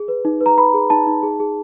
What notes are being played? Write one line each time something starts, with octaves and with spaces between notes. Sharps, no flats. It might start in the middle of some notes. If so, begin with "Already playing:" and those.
Already playing: G#4
B4
D#4
B4
A#5
B4 B5
G#4
D#4 A5
D#4
G#4
G#4